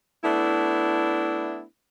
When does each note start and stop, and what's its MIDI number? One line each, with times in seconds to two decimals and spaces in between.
0.24 1.63 57
0.24 1.63 59
0.24 1.63 62
0.24 1.63 64